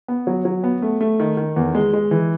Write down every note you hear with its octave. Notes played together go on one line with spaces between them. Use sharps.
B3
F#3
F#3
B3
A3
A3
D#3
D#3
E2
G#3
G#3
E3